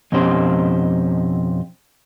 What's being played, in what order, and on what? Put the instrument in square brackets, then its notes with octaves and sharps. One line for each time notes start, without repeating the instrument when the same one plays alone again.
[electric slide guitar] F2 B2 C#4 D#4 G4 C5